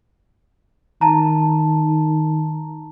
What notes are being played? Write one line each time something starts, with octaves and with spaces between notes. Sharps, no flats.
D#3 A5 A#5